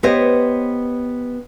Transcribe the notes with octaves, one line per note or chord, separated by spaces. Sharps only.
B3 G4 C5 C#5 D#5